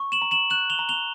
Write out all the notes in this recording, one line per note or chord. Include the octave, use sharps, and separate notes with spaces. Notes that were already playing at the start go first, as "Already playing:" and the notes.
Already playing: C#6
E7 F#7
A#5
E7 F#7
F#6 E7 F#7
F7 G7
A#5
F7 G7